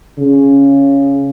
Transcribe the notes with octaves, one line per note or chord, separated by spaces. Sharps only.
C#3